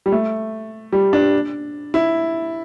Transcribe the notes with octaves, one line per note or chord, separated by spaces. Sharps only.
G3
A3
G3
D4
E4